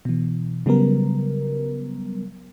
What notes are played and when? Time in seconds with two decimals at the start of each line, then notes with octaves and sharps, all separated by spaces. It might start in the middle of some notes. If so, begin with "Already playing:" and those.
0.05 B2 E3
0.66 C#3 F#3 G3 B3 A#4